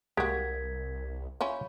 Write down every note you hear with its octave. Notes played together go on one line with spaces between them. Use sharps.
C2 G#3 A#3 F#4 G4 A#4 G#6 B6
C#4 E4 F4 C#5 B5